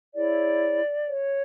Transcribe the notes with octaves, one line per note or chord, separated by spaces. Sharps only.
E4 G#4 C#5 D5
C#5